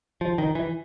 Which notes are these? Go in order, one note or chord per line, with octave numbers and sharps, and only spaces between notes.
F3
D#3
E3